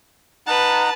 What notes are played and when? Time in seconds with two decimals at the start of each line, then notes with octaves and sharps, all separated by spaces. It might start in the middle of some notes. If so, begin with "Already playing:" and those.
0.47 D#4 B4 F#5 A5 A#5